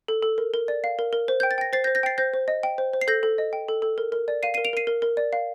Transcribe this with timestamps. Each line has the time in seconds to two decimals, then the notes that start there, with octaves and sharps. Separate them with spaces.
0.08 A4
0.23 A4
0.38 A#4
0.54 A#4
0.68 D5
0.84 F5
0.99 A#4
1.13 A#4
1.28 C5
1.40 G5 G6
1.51 A6
1.58 G5 A#6
1.73 C5 A6 C7
1.84 G6 A#6
1.87 C5
1.95 G6 A#6
2.03 G5 A6 C7
2.18 C5 G6 A#6
2.34 C5
2.48 D#5
2.63 G5
2.78 C5
2.93 C5
3.01 C7
3.08 A4 G6 A#6
3.23 A4
3.38 D#5
3.53 G5
3.68 A4
3.82 A4
3.98 A#4
4.12 A#4
4.28 D5
4.43 F5 C7 D#7
4.54 A#4 C7 D#7
4.65 D7 F7
4.73 A#4 C7 D#7
4.87 A#4
5.02 A#4
5.17 D5
5.33 F5